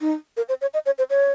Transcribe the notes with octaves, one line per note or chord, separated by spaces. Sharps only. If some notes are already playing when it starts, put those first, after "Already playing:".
D#4
A#4
C5
C#5
D#5
C#5
C5
C#5